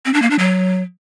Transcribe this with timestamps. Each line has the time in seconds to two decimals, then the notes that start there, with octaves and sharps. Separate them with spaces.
0.05 C4
0.14 D4
0.22 A#3
0.30 D4
0.39 F#3